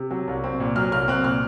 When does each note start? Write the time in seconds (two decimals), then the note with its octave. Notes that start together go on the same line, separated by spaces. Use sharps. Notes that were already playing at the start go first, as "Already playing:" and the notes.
Already playing: C3
0.11 F#3
0.27 C2
0.44 C4
0.60 A#2
0.76 F#3 F6
0.92 C2 F6
1.08 C4 F#6
1.24 A#2 F6